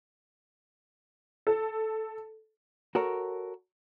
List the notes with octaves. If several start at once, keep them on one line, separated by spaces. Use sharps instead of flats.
A4
F#4 A4 A#4 C#5